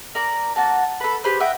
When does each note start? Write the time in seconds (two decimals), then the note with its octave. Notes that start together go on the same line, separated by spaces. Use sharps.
0.15 A#4 D5 A#5
0.56 A#3 F#4 A5
1.00 A4 B4
1.24 G4 G#4 B4 C5
1.40 D#5 E5 F#5 G5